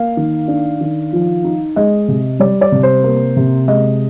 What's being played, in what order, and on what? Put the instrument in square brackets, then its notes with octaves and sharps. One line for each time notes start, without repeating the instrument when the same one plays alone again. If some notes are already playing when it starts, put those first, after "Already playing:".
Already playing: [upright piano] A#3 F5
D#3
D4
D#3
F3
D#4
G#3 D#5
C3
G3 D5
D5
C3
C5
A#3
C3
G#3 D#5